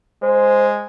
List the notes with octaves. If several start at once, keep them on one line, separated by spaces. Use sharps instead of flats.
G#3 C5